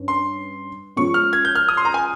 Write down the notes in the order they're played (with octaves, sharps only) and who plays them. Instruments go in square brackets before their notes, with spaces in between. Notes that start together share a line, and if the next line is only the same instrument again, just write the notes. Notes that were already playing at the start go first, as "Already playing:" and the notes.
Already playing: [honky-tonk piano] G2 C#4
[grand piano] C6
[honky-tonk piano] F3 G#3 C#4 [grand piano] C#6
[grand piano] F6
G#6
G6
F6
D#6
C6
A#5
G#5